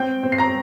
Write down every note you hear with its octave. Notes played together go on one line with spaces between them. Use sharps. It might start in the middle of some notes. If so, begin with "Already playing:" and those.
Already playing: C4 G5 G6
C4
C7
A#5 A#6